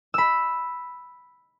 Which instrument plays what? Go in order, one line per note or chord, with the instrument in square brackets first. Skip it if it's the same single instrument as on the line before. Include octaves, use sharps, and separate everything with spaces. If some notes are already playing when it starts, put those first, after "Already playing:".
[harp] B5 E6